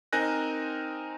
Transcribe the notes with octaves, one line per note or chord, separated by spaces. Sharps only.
C4 D#4 A#4 G#5 F#6 A#6